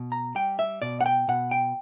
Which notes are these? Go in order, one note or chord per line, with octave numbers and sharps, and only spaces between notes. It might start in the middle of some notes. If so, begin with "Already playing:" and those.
Already playing: B2
A#5
G3 G5
E5
B2 D5
F#5
G5
B2 F#5
G5